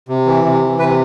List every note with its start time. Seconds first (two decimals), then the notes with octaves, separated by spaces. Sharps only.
0.08 C3
0.26 E3
0.44 C3
0.62 E3
0.79 C3 B4